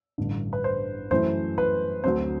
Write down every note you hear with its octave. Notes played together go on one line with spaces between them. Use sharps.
A1 G2 D3
B4
C5
F#2 E3 A3 E4 C5
B4
D2 D3 F#3 C4 C5